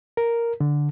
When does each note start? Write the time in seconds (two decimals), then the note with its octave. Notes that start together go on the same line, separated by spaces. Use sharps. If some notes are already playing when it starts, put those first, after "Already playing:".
0.17 A#4
0.60 D3